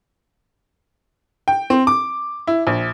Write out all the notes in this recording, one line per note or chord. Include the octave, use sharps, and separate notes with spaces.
G5
C4
D6
E4
A#1